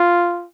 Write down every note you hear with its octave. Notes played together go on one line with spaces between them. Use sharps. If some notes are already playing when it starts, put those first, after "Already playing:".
Already playing: F4